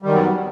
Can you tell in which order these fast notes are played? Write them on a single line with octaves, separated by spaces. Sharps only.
G3 D#3 F#2 F#3 B3